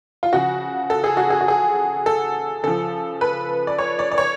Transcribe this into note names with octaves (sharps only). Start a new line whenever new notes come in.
F4
C#3 F3 F#4
A4
G#4
F#4
G#4
F#4
G#4
A4
C#3 F3 A4
B4
D5
C#5
D5
D5
C#5